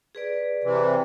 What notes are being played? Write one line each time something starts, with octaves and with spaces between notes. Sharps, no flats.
G#4 B4 D5
C3 E3